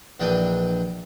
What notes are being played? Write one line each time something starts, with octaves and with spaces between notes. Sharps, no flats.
A#1 E3 D4 D#5 G5